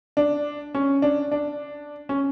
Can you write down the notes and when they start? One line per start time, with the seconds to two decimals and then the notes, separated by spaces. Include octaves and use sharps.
0.17 D4
0.75 C#4
1.02 D4
1.32 D4
2.09 C#4